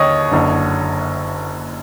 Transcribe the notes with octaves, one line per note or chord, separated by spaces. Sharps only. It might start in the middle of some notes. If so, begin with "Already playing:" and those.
Already playing: D#2 D3 C#5 D#5
F#1 F#2 D3